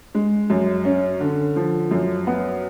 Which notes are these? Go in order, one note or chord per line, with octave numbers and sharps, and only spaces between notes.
G#3
F#2
C#4
D3
F3
F#2
B3